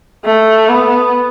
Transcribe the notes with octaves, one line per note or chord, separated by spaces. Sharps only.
A3
B3